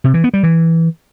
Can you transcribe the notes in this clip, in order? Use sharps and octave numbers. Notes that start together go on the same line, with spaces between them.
C3
E3
B3
G3
E3